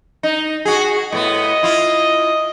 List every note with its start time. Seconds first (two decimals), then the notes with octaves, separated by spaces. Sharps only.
0.23 D#4
0.65 F#4 G#4
1.12 A2 B3 D#5
1.63 E4 F4